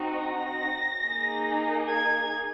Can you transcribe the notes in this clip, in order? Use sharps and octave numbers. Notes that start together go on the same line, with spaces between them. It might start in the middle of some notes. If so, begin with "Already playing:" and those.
Already playing: C4 D#4 F#4
A#6
A#3 D#4 G#4
G#6